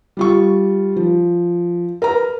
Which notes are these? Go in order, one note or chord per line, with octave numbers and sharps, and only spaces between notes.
G3 F4 C#6
F3
A#4 B4 A#5